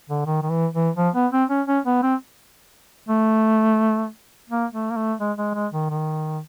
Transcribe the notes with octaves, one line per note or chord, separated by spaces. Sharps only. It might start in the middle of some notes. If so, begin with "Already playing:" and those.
D3
D#3
D#3
E3
E3
F3
B3
C4
C#4
C#4
B3
C4
A3
A#3
A3
A#3
A3
G#3
G#3
G#3
D#3
D#3